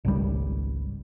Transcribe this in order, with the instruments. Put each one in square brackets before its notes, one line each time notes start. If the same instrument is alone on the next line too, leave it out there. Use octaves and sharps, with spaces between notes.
[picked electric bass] G#1 C#2 G3